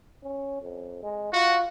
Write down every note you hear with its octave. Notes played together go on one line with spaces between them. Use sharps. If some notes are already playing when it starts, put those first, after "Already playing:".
C#4
F2
G#3
F4 F#4